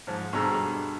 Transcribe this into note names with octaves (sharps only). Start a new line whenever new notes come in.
G#2 F3
G2 B2 D3 G#4 A#5 E6